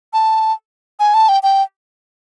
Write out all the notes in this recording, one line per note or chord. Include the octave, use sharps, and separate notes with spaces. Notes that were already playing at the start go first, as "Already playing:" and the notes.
A5
G#5
A5
G5
G5